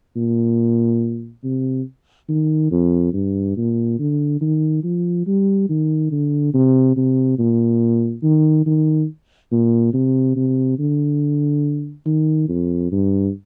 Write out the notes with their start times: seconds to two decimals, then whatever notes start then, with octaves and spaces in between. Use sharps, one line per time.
0.16 A#2
1.44 C3
2.29 D#3
2.71 F2
3.13 G2
3.57 A#2
3.99 D3
4.41 D#3
4.84 F3
5.27 G3
5.69 D#3
6.12 D3
6.54 C3
6.97 C3
7.39 A#2
8.23 D#3
8.67 D#3
9.52 A#2
9.94 C3
10.36 C3
10.79 D3
12.06 D#3
12.49 F2
12.92 G2